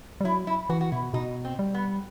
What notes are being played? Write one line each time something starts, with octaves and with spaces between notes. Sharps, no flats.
G3
F#3 E4
E4
E3 F#4
F#4
B2 E4
B2 D#4
C4
G3
B3